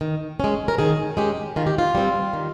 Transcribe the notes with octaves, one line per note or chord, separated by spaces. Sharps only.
D#3
G#3 C#4
A#4
D#3 G#4
G#3 C#4 G4
D#3 F4
G4
F4
G3 C4
D#3